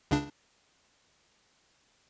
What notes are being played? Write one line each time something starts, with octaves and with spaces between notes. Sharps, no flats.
C#2 C#3 D4